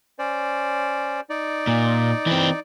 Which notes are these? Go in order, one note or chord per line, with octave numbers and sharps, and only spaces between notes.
C#4 C5 D5
D#4 D5
A#2
E3 C4